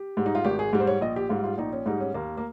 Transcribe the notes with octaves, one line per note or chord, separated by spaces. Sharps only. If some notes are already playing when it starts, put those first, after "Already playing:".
Already playing: G4
G#2 G3
D#4
F4
G#1 G4
G#4
G#2 G3
C5
C#5
A#1 D#5
G4
G#2 G3 F4
F4
A#1 D#4
C#4
G#2 G3 D#4
C#4
D#2 A#3
A#3